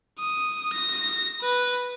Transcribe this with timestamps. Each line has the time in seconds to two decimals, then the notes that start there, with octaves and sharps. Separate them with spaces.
0.19 D#6
0.73 A#6
1.42 B4